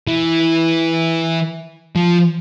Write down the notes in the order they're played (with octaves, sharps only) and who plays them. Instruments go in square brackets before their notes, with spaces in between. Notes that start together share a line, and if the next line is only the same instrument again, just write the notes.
[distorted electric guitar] E3
F3